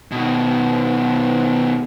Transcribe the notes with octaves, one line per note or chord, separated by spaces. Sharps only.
B2 D#3